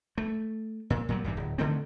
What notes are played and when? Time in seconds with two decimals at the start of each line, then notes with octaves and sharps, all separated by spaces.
0.18 A3
0.90 A#2
1.09 A#2 F#3 G3
1.24 B1 G2 E3 G3
1.37 D1
1.58 D3 D#3 A3 C4